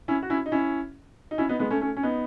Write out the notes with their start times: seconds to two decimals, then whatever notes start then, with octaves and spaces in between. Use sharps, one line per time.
0.08 C#4 E4
0.23 F#4
0.30 C#4 E4
0.46 D#4
0.52 C#4 E4
1.31 D#4
1.38 C#4 E4
1.49 B3 D#4
1.59 G#3 B3
1.70 A3 C#4
1.81 A3 C#4
1.97 C#4
2.03 B3 D#4